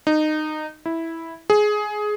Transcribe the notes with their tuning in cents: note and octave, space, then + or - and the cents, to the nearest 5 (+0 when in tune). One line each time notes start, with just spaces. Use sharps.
D#4 -20
E4 -5
G#4 +15